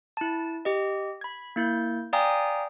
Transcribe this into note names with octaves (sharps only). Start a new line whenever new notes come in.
E4 A5
G4 D#5
B5 G#6
A#3 E4 G6
D5 F5 G5 G#5 A#5 D#6